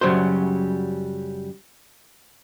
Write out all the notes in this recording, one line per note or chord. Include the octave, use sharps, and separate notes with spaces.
F#2 C#3 F#3 G3 C5